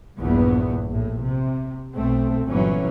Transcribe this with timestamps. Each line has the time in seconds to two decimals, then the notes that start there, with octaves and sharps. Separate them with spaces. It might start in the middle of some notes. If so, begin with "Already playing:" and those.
0.18 A#1 E2 G2 B3
0.88 A#1 A2
1.24 C3
1.95 B1 A3 C4
2.46 G1 A#2 E3 F#3 C#4